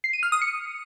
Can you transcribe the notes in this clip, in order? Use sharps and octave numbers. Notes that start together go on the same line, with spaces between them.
C7
D#7
F6
D#6
C#7